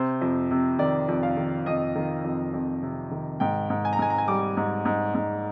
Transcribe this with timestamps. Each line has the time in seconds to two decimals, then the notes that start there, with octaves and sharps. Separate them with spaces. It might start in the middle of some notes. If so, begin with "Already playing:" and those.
Already playing: C3 C5
0.22 F2
0.51 C3
0.79 D#3 D5
1.08 F2
1.23 F5
1.37 D#3
1.66 F2 D#5
1.95 D#3
2.24 F2
2.54 F2
2.83 C3
3.11 D#3
3.40 G#2 G5
3.70 G#2
3.85 G#5
3.93 A#5
3.99 G#2 G#5
4.10 A#5
4.18 G#5
4.28 G3 D6
4.57 G#2
4.85 G#2
5.15 G#2